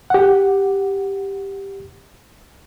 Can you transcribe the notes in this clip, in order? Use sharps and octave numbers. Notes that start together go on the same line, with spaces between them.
G4 F#5